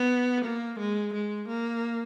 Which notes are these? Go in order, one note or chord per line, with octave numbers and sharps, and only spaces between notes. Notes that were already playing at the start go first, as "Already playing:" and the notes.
Already playing: B3
A#3
G#3
G#3
A#3